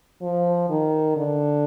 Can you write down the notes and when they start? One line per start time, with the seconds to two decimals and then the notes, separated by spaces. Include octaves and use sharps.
0.22 F3
0.70 D#3
1.16 D3